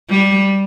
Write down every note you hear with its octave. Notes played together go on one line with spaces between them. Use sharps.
G3